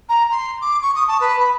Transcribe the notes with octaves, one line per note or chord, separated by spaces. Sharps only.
A#5
C6
D6
C#6
D#6
A5
B4
B5